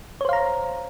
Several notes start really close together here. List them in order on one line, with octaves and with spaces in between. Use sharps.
C#5 C5 F5 A#5